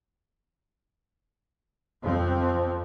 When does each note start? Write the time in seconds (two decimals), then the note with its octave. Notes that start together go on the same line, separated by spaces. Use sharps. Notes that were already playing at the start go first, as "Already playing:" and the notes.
2.03 F2 F3 C4